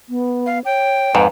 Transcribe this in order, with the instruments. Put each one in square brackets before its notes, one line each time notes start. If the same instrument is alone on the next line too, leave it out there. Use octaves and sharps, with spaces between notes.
[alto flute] B3
[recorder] F5
[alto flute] C#5 [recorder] G5
[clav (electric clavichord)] F2 G#2 [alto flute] B4